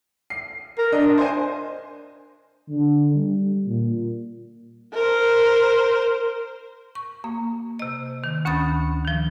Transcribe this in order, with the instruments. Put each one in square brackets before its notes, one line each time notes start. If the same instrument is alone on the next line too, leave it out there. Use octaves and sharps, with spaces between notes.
[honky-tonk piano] C7
[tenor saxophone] A#4
[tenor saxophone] D4 [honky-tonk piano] D#5
[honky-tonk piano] C5 G#5
[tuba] D3
G3
A#2
[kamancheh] A#4 C5
[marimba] C#6
A#3
C3 D#5
D#3
D2 C#4 B5 D#6 A6
D#3 F3